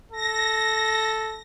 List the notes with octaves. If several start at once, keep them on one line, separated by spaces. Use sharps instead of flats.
A4 A#6